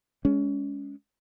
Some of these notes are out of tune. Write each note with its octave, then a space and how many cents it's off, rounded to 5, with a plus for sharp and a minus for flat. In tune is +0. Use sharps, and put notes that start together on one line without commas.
G#3 +0 C#4 +25